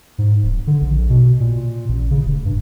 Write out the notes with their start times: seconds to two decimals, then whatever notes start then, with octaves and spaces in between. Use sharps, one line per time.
0.18 G#2
0.43 D1
0.67 D3
0.81 A#1
1.10 B2
1.40 A#2
1.89 A1
2.11 C#3
2.26 F1
2.45 G2